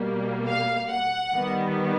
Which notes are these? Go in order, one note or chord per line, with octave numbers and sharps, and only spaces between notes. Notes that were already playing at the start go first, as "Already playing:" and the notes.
Already playing: B2 G3 A#3
F5
F#5
D#3 G3 B3